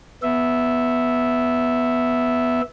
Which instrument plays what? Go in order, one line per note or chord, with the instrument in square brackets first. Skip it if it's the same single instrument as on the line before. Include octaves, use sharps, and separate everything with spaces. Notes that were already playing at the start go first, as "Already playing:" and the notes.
[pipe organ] B3 E5